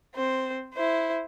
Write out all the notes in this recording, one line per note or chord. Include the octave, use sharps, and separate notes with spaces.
C4 C5
E4 C5